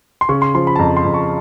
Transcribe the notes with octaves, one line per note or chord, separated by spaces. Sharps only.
C6
C#3 C#6
C6
F3 C6
B5
A5
F2 A#5
C6
F2
C#6